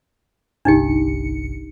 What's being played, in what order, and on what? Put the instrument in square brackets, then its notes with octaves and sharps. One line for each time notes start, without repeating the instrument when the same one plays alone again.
[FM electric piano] G1 C2 C#7 [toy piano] D4 D#4 G4